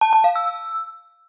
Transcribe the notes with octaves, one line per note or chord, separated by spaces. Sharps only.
A5
A5
F5
E6